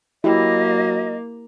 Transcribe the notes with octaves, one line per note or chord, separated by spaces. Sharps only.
F#3 A#3 E4 G4 D#5